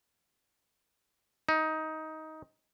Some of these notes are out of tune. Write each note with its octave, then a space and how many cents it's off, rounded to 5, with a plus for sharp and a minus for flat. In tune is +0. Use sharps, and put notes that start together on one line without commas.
D#4 +15